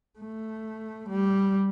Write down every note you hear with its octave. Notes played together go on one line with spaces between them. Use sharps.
A3
G3